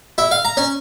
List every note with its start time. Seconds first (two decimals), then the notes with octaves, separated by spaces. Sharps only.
0.18 E4
0.31 F5
0.45 A#5
0.57 C#4